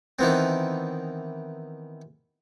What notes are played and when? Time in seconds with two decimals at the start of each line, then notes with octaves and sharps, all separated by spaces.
0.19 D#3 E3 B3 C4